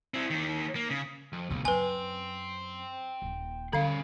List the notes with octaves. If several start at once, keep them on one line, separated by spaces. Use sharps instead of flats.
C4 E4
D#2 D#3
A#3
C#3
F2
D1 C#2 B2
F#2 B4 G5 G#5 C6
D#1 A#3
D3 G3 C#4 F5 B5